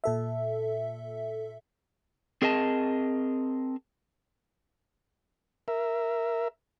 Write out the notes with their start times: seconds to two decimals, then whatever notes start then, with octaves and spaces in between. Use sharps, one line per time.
0.04 A#2 A4 E5
2.42 C4 G#4 A#4 D#5 A5
5.68 A#4 E5